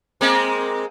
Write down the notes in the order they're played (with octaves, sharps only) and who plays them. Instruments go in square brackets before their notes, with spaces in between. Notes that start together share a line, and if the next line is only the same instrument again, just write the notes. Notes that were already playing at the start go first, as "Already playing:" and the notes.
[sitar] G#3 A#3 C4